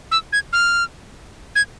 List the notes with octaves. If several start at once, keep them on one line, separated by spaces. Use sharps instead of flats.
E6
G#6
F6
G#6